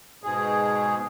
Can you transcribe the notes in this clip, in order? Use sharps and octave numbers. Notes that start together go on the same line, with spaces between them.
G#2 B2 G#4